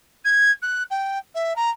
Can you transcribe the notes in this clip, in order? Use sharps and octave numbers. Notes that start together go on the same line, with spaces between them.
G#6
F#6
G5
E5
A#5